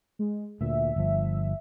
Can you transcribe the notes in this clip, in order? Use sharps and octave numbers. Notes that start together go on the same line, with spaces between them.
G#3
D2 A#2 E5
G1 F3